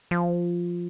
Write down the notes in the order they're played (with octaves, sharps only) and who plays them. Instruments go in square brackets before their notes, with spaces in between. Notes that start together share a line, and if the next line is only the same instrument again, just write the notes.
[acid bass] F3